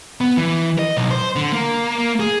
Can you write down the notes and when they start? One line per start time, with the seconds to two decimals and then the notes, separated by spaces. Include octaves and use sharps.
0.21 B3
0.37 E3
0.79 D#5
0.97 B1
1.11 C5
1.36 D3
1.53 A#3
1.98 A#3
2.20 G#4